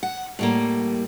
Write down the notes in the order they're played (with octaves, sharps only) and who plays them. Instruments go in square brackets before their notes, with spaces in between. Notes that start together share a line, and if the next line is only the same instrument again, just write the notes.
[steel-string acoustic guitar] F#5
A2 G3 A#3